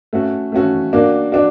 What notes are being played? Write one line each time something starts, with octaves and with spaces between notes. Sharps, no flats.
A3 C#4 F#4 A4
A3 C#4 F#4 A4
A#3 D4 F#4
D4 F#4